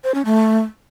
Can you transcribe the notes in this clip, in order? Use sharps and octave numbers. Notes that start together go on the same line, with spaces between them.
C5
C#4
A3